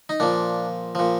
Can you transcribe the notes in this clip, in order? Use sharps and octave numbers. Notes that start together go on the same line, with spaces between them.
D#4
A#2 F3 D4
A#2 F3